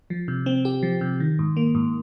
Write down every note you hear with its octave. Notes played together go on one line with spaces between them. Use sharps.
F3
C3
C4
G4
F3
C3
D#3
G#2
A#3
G#2